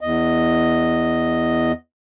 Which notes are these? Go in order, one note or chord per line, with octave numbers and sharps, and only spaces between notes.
E2 D#5